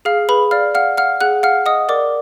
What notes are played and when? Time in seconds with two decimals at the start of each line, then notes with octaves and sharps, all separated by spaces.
0.05 G#4 F5 F6
0.29 G#4 B4 B5
0.51 D5 F5 F6
0.75 F5 F#5 F6
0.97 F5 F#5 F6
1.21 G#4 F#5 F#6
1.43 F5 F#5 F6
1.66 D#5 F#5 D#6
1.89 A#4 D5 D6